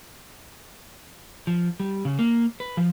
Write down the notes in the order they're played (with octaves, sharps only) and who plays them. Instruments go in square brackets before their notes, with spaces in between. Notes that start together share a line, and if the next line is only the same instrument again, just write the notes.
[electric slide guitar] F3
G3
C#3
A#3
B4
F3